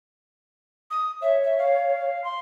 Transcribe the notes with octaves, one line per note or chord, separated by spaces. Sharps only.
D#6
C#5 E5
E5
F5
C6